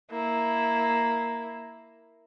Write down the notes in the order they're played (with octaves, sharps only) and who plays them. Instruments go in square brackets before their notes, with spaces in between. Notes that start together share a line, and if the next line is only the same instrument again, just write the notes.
[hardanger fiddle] A#3 E4